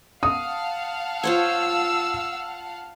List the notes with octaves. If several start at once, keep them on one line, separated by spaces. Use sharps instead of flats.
F5 F#5 A5 D#6
F4 C5 C#5 E6